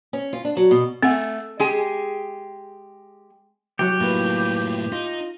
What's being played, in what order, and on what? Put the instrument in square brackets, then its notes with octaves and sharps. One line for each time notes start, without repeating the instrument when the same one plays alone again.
[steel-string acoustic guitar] C#4
F4
D4
F#3
B2
[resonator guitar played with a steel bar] A3 [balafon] C4 F#5
[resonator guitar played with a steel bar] G#3 G4 G#4
[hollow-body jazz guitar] C2 F#3 [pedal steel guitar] G4
[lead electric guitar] A2 F4 [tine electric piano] A#3 E4 B4
[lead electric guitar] D#4 [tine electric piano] F4